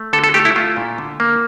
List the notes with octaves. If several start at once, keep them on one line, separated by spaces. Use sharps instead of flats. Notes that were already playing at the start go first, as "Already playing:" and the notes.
Already playing: A3
D3 A4
A4
A3 G4
E4
A3 F4
A#2
D3
A#3